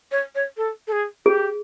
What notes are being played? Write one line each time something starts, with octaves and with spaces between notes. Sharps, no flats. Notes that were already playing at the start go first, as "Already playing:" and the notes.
C#5
C#5
A4
A4
G#4
G4 G#4